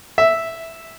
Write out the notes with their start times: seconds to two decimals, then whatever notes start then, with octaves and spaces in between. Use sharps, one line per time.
0.18 E5